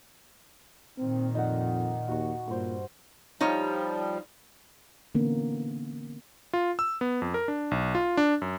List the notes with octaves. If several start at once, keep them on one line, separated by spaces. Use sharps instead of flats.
A#2 D#3 C4
F2 D#4 D5 F#5
D#2 F#4 C#6
G2 A#2 C5 D6
F3 G3 D#4 F4 C#5
D3 E3 A#3 B3 C#4
F4
E6
B3
F2
A#4
D4
B1
F4
D4
F#2